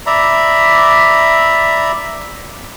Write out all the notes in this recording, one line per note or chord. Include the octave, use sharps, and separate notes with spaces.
D5 E5 A#5 B5